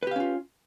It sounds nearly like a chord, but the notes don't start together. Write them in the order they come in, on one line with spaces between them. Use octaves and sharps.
B4 G4 F5 C#4 F4